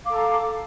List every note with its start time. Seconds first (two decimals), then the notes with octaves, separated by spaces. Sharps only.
0.04 F5
0.07 D6
0.09 A4
0.12 A#5